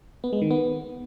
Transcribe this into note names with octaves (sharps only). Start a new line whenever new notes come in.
B3
G#3
D#3
B3